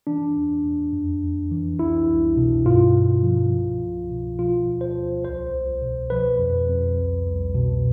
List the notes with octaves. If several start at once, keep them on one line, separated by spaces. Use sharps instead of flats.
E3 D4
E2
E2
F2
F2
E3
C2 E4
C2
B2
G2 F4
G2
F3
C2
C2
B2
F3 F4
D2
C5
D2
C2 C5
C2
B2
F3 B4
F2
F2
C2
C2
B2